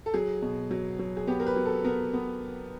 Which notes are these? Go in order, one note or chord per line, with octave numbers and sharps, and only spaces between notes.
A4
F#3 G#4
B2
F#3
F#3
G#4
B3 G4
A#4
B4
F#3
A4
B3 A#4
B3